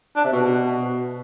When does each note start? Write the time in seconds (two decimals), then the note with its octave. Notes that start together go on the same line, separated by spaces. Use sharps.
0.16 D4
0.24 C3
0.32 B2